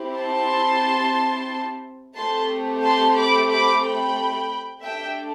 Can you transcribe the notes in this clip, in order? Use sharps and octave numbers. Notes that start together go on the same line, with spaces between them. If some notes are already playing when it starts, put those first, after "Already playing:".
Already playing: C4 E4 G4
A5 C6
A3 C4 G4 A5 C6
A5 C6
B5 D6
B5 D6
G5 B5
A3 D4 G4 E5 G5